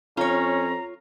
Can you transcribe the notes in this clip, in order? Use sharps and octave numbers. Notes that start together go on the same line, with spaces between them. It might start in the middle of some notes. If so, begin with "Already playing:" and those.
F2 C#4 F4 C#5 A#5